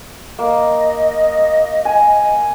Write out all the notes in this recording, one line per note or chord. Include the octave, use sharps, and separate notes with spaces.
A#3 D#5
G#5